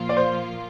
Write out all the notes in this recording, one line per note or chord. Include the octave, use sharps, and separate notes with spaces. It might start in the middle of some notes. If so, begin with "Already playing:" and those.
Already playing: A#2 F3 A#3 F4
D5
C5